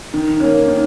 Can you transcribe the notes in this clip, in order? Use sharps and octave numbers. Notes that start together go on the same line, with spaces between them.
D#3
A#3 C#4
D#3